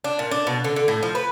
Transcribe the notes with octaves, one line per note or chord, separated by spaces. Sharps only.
D4
A#2
D4
B2
D3
D3
A2
F3
B4